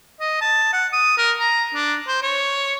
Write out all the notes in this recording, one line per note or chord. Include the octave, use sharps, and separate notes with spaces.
D#5
A5
F#5
D#6
A#4
A#5
D4
C5
C#5